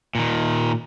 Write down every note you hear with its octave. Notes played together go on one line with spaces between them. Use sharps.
A#2 D#3